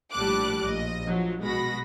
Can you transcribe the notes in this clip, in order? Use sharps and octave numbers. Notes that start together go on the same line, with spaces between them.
A#1 A2 G3 A5 D6 F#6
A#1 D#5
F3 F#3
B1 B2 G#3 F#4 B5 A#6